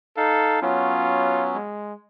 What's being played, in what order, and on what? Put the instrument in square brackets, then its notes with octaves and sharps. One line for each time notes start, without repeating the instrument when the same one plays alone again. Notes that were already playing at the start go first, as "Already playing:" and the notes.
[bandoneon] D#4 F5 [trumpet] A4
[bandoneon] F#3 B3 C#4 [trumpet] F4
[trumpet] G#3